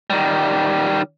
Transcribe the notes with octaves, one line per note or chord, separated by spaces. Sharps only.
D#3 G3